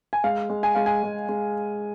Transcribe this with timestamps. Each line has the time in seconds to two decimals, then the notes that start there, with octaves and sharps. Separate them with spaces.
0.13 G#5
0.24 G#3 F5
0.50 G#3
0.63 G#5
0.75 G#3 F5
0.86 G#5
1.03 G#3
1.29 G#3